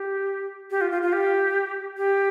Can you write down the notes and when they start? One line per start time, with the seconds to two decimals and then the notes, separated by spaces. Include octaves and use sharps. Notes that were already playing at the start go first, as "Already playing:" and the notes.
Already playing: G4
0.71 G4
0.81 F4
0.91 F4
1.02 F4
1.13 G4
1.97 G4